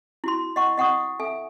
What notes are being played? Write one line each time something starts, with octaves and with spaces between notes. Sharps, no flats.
E4 F#4 C6
D#5 F#5 C#6
D#5 F#5 C#6 D#6
A4 E5 G#5